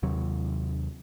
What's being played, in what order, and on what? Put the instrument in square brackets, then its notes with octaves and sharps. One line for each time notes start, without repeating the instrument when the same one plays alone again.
[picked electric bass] D#2 C3 F#3